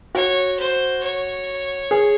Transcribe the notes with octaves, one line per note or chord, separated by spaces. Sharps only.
F#4 C#5
C5
C#5
G#4